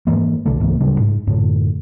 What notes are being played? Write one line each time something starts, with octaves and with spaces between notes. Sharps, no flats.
G#2 B2 E3 A#3
B1 D3 A3
C#2 G#2 E3 A#3
D1 C#3 G3 D4
G#2
F#2 A2 D3